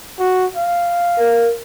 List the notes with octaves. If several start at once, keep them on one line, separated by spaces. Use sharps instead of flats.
F#4
F5
A#4